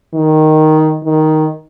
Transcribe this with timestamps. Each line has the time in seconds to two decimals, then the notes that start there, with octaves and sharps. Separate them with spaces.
0.14 D#3
1.05 D#3